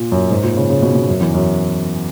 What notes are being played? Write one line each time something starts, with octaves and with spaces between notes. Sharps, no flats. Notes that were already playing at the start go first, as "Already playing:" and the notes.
Already playing: A#2
F#2
G#2
A#2
C#3
C#3
B2
B2
F#2
E2
F#2